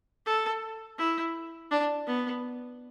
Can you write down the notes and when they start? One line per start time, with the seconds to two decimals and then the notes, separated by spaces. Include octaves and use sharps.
0.26 A4
0.98 E4
1.71 D4
2.07 B3